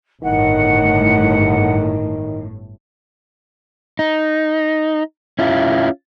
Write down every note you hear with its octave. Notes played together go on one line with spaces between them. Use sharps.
G1 A2 D#3 F#5
D#4
C#4 E4 F4